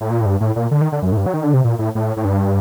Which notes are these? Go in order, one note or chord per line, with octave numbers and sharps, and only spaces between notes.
A2
A#2
A2
G2
A2
A#2
D3
D#3
D3
F#2
A2
G2
F#3
D#3
D3
C3
A#2
A2
A2
A2
G2